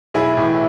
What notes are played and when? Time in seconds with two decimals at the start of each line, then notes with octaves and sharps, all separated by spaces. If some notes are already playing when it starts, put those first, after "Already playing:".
0.14 B1 E4 G#4
0.37 A2 E3